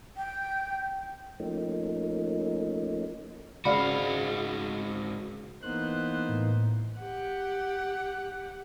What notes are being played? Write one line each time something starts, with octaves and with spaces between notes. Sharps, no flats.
G5
F3 A3 A#3 C#4 D#4
G#2 C#3 G#3 F#4 D5 F5 B5
E3 A#3 B3 D#4 C5 F#6
A2
G4 F#5